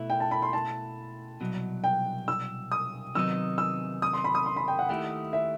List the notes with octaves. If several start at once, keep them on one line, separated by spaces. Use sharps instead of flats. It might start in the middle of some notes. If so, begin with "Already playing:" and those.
Already playing: B2 A3 E4
G5
A5
B5
C6
A5
C2 B2 F#3
G5
E6
D#6
C3 D#3 F#3 B3 D#4 E6
E6
D#6
C6
B5
D#6
C6
B5
G5
F#5
D#2 D#3 A3 E4 G4 F#5
E5